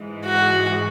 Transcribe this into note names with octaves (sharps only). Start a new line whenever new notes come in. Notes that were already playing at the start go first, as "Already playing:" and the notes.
Already playing: G#2 E3 G#3
F#4